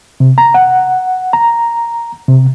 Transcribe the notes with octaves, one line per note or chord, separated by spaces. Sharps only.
C3
A#5
F#5
A#5
C3